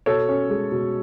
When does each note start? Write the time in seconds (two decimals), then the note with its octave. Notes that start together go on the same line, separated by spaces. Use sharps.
0.06 B2 A4 C#5
0.29 C#4
0.50 G#3
0.72 B2